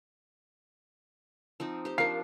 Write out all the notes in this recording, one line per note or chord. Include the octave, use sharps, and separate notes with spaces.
F3 C4 D#4
G4 C5
F3 D4 A#4 F5 C7